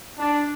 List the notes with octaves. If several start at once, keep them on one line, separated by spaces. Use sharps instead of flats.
D4